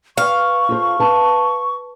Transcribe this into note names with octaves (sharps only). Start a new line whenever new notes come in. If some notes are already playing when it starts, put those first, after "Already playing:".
B4 F5 C#6
F4 A4 C5
B4 A5